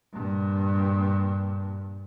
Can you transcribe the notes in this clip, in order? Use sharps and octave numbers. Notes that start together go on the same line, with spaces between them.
G2 A#2